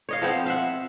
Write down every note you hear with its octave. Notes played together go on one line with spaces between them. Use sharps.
C#5 D#5 F5
F3 B3 C4
F4 E5 F#5